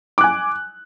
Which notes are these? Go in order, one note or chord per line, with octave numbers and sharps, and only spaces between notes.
G#5 D6 F#6